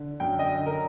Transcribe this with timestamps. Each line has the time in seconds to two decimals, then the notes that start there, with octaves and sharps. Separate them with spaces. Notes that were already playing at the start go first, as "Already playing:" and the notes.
Already playing: D3
0.20 F#2 G5
0.39 D#5
0.59 D3
0.66 A#4